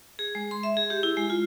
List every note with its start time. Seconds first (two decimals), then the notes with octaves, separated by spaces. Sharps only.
0.19 G#4
0.35 G#3
0.51 C6
0.63 E5
0.77 G#4
0.90 G4
1.03 E4
1.17 G#3
1.30 F4